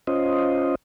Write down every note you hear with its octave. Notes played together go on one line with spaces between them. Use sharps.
C#4 F4 C5 D#5